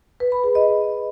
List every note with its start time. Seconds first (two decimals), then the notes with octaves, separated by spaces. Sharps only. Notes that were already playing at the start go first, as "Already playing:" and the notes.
0.20 B4
0.32 B5
0.44 G#4
0.55 D#5